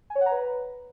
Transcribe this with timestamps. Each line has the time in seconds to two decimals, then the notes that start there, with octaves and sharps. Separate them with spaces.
0.10 G#5
0.15 C#5
0.21 F#5
0.26 A#5
0.31 B4